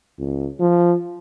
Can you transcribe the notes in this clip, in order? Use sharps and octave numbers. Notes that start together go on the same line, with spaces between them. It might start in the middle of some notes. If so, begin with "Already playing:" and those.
C#2
F3